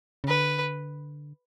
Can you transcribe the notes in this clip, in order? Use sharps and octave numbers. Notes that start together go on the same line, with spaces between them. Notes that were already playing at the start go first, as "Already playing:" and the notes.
C#3
D3 B4